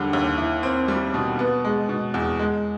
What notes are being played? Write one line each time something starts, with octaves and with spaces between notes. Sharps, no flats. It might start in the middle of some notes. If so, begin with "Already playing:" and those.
Already playing: D#2 D3 G3
D#2
E4
C4
G3
B2
B3
G#3
B2
E2
G#3